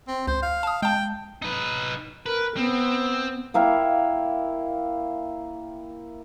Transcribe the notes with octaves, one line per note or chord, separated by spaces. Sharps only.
C4
C#2 C5
F5
A5 D#6
G#3 G5 A5
D#4 B4
A#4 B4
B3 C4
A#3 E4 F5 G5